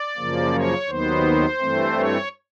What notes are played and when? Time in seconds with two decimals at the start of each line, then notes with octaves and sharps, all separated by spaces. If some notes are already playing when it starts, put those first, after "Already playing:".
Already playing: D5
0.17 F#2 C#3 F3 A#3
0.53 C#5
0.88 D#2 D#3 F#3 B3 C5
1.60 G2 E3 A3 C4
1.96 C#5